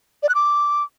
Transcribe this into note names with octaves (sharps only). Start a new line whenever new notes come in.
D5
F#6
D6